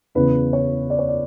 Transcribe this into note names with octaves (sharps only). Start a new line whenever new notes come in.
E2 C#3 E3 B4
C#5
D5
C#5
D5